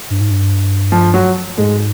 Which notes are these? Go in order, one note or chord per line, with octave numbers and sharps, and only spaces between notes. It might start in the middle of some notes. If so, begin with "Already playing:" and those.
G2
G#2
G2
F3
F#3
G#2 G#3